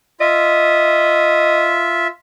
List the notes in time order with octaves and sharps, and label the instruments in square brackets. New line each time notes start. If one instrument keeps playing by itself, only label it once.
[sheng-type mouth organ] F4 E5 [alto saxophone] D#5